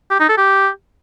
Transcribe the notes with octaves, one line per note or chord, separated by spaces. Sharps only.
G4
D#4
A4
G4